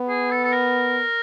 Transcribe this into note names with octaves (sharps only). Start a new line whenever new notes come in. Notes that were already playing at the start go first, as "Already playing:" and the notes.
Already playing: B3
G#4
A4
A4
A#4